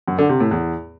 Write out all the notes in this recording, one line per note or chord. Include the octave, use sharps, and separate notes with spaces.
F#2
D3
C3
A2
E2